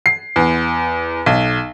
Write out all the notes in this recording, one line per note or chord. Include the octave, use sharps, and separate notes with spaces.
C7
E2
B1